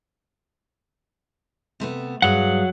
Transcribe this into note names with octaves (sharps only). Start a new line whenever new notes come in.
C3 A3 B3
G2 F#3 G#4 F5 F#5